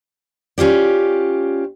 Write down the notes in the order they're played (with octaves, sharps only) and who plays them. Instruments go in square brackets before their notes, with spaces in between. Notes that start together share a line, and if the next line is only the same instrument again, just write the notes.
[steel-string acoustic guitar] C#4 F4 G4 D5